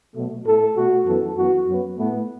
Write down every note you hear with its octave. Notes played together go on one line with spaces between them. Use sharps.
B2 F#3 A3
A2 A3 A4
B2 A3 F#4
F#2 E3 B3 A4
F#2 E3 B3 F#4
F#2 F#3 B3
A2 A3 B3